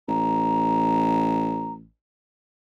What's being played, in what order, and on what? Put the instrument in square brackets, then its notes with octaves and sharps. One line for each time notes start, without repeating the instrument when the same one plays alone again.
[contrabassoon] A1 [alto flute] A#5